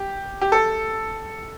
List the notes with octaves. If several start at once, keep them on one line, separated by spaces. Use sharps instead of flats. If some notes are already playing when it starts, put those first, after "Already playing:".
Already playing: G4
G4
A4